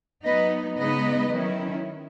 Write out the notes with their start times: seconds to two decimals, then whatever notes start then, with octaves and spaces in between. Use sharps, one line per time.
0.24 F#3 B3 D#4 B4 D#5
0.77 C#3 G#3 B3 D#4 B4 D#5
1.30 D#3 F#3 C#4 E4